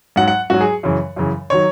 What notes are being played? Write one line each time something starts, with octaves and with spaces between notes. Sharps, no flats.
G#2 F#3 F#5
F#5
G#2 F#3 F#4
G#4
F#2 C#3 E3
F#2 C#3 E3
D#3 F#3 C#5